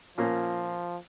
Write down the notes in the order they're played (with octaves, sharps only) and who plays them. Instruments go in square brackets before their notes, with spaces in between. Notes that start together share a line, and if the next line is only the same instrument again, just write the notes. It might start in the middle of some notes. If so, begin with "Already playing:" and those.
[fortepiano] A#2 A#3 C#4 [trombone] F3